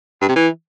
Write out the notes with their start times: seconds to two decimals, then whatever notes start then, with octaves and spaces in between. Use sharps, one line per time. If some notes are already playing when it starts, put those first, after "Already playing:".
0.21 G2
0.28 C3
0.36 E3